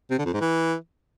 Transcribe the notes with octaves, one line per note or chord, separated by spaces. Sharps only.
C3
D3
F2
G#2
E3